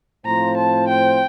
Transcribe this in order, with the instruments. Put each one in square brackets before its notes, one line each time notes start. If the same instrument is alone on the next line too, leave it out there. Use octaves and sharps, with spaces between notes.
[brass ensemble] A2 F3 C4 F4 C5 [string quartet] A#5
[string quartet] A5
G5